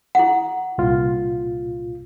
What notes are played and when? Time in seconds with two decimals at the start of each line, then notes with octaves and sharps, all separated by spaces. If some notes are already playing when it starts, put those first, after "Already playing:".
0.15 E4 F#5
0.78 C2 A#2 F4